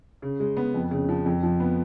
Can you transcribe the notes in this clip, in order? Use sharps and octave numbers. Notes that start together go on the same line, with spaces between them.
C#3
G#3
B3
F2
C#3
F3
F2
F3
B3